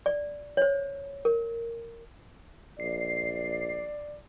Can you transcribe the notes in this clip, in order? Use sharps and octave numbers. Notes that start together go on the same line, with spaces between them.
D5
C5 C#5
A#4
A#1 D5 C7